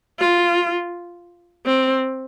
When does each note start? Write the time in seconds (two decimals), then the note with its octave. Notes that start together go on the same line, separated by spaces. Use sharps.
0.19 F4
1.66 C4